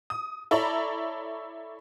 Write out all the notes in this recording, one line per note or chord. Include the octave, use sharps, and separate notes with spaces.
D#6
E4 A4 C#5 D5 A#5 B5